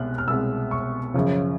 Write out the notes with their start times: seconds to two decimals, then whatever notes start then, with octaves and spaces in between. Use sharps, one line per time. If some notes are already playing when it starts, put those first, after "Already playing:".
Already playing: C2 B2 G#3 B3 F6 F#6
0.18 F6
0.28 C2 B2 G#3 B3 E6
0.71 C#6
1.14 F#2 C#3 F3